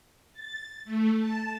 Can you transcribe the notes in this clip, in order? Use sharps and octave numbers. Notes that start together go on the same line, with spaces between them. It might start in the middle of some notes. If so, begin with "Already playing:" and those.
A6
A3
A5